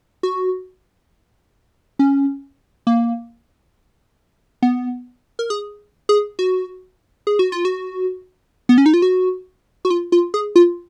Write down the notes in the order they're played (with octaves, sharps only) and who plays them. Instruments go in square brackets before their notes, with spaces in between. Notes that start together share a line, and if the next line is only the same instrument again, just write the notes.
[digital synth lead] F#4
C#4
A#3
B3
A#4
G#4
G#4
F#4
G#4
F#4
F4
F#4
B3
C#4
D#4
F4
F#4
F#4
F4
F4
G#4
F4